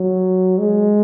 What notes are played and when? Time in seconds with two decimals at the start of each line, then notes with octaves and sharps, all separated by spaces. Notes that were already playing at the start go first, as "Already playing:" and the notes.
Already playing: F#3
0.58 G#3